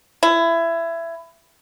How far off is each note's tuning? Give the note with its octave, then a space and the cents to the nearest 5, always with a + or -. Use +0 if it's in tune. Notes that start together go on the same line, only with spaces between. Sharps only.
E4 +20